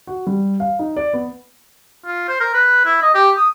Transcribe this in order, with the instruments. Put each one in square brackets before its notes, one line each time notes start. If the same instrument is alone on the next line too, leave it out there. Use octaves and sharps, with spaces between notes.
[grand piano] F#4
G3
F5
D#4
D5
B3
[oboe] F4
C5
A#4
B4
E4
D#5
G4
D#6